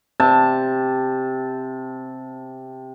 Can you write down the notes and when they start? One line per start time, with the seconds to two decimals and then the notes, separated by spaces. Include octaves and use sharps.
0.20 C3 A5